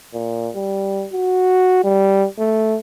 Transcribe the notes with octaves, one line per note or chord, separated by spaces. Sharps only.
A#2
G3
F#4
G3
A3